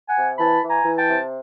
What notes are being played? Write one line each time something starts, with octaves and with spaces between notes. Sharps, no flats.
F#5 G#5
C3
E3 A5 B5
E3
G#5 A#5
E3
G5 A5
C3